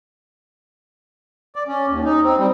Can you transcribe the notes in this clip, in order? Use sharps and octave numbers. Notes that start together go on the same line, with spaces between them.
D5
C#4
D#2
D#4
C4
G3